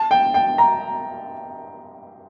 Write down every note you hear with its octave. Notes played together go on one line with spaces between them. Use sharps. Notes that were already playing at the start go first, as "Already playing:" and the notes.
Already playing: A5
G5
G5
A#5